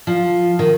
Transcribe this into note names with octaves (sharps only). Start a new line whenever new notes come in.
F3
D#3